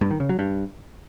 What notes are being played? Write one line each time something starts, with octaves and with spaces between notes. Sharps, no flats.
G2
D#3
C#3
F#3
G2